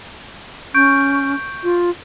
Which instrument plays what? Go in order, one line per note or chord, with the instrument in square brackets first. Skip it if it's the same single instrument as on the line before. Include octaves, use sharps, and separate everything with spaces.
[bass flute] C#4 [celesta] C#6 G6 D7
[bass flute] F4